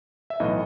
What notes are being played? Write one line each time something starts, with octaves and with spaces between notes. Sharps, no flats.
E5
B1 A2 E3 D#5